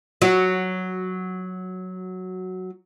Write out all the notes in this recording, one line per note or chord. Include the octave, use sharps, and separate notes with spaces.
F#3 F#4